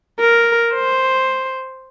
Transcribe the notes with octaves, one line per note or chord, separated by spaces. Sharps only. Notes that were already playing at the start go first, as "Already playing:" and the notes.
A#4
C5